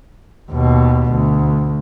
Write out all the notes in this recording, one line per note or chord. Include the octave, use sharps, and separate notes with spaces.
D#2 B2
D2